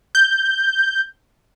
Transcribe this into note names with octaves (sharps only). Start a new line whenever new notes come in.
G6